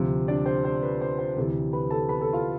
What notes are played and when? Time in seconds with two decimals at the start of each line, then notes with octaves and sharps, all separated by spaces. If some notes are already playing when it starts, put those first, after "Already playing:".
Already playing: D2 C3 F3
0.28 D4 D5
0.46 C5
0.65 C5
0.83 B4
1.01 C5
1.19 C5
1.36 D2 C3 E3
1.73 B4 B5
1.91 A4 A5
2.09 B4 B5
2.21 A4 A5
2.33 F4 F5